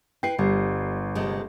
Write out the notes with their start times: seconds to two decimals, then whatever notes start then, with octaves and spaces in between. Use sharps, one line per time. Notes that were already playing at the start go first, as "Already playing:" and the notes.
0.23 E4 B4 G5 C7
0.39 G1 G3
1.15 C3 G#3 A3